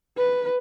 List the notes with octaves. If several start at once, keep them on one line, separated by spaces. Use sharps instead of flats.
B4